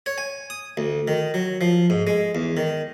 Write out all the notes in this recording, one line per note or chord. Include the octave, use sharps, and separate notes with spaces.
C#5
G#5
D#6
D2
D#3
F#3
F3
G#2
G#3
E2
D#3